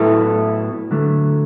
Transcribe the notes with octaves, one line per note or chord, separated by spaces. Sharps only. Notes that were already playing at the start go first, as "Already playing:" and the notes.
Already playing: A2 F#3 B3 E4 A4
D3 F#3 A3